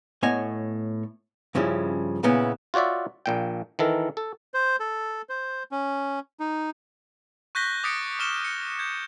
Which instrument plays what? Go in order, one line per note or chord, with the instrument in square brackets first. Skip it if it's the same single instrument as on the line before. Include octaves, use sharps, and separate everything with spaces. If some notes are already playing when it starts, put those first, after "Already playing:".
[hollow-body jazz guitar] A2 B3 C#5 D#5 G#5
G2 C#3 F3 C#4 E4
A#2 C#3 B3 C#4 E4
[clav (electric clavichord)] F4 F#4 C#5 D5 E5
A#1 A#2 G5
D#3 E3 A4 A#4
A4
[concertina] C5
A4
C5
C#4
D#4
[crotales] C#6 F#6 G6 A#6 B6 G7
D6 D#6 A6 B6 C#7 D7
C#6 F6 C#7 E7 G7
C#7
G6 G#6